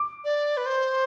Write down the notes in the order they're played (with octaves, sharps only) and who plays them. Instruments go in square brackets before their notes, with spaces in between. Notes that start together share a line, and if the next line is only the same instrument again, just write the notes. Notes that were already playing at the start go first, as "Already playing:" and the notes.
Already playing: [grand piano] D6
[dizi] D5
B4
C5